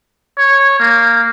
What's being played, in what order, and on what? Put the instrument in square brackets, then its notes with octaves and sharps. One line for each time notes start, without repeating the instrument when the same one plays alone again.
[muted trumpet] C#5
A#3